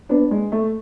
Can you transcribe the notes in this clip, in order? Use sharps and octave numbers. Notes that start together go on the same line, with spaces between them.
B3 D4
G#3
A3